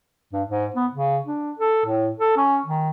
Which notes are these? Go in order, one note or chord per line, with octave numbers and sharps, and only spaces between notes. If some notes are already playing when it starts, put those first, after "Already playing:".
G2
G#2
B3
C#3
D4
A4
A2
A4
C#4
D#3